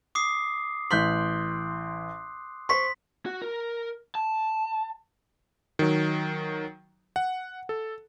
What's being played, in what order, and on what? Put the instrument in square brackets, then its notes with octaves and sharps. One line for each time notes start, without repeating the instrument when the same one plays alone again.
[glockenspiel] D6 D#6 C7
[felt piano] A1 G6 B6 [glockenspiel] C6 F#6
[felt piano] C5 C#6 [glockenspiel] C6 B6
[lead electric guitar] F#4
A#4
A5
[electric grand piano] D#3 F#3
F#5
A4